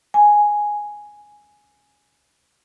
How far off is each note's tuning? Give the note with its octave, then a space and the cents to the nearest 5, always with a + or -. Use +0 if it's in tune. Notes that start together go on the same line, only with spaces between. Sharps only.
G#5 +0